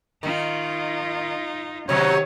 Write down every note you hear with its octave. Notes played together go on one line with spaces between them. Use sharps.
D#3 D#4 F4
C3 D#3 F#3 C#4 C#5